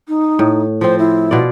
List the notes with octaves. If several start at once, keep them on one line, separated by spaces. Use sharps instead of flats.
D#4
A2
F3 C4 C5
E4
B2 F4 D5